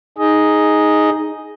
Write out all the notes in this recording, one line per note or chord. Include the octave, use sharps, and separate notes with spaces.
D#4 G#4 D#5